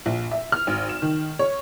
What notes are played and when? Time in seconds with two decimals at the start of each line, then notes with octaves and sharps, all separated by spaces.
0.06 A#1
0.31 E5
0.52 F6
0.67 G#1
0.89 E7
1.02 D#3
1.39 C#5